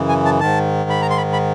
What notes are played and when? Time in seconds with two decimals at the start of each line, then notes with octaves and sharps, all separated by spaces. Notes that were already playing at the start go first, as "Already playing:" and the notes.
Already playing: F#2 C#3 E3
0.09 G#5
0.25 A5
0.40 G#2 D#3 A5
0.90 B5
1.02 A#5
1.10 C6
1.17 B5
1.33 B5